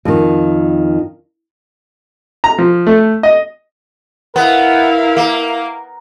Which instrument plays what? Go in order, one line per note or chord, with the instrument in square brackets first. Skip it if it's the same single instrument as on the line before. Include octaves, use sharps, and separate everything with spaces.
[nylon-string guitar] F2 D#3
[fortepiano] A#5
F3
A3
D#5
[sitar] B3 [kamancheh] E4 F5 [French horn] A#4
[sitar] A#3